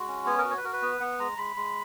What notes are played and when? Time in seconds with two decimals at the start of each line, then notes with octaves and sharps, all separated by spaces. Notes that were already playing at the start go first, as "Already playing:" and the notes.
Already playing: G#3 F#4
0.08 C#4
0.26 B3 C#5
0.38 A#4
0.45 F#4
0.51 C#5
0.57 B4
0.64 F#4 A#4
0.73 B4
0.82 B3
1.00 B3 F#5
1.19 G#3 A#5
1.37 G#3 B5
1.56 G#3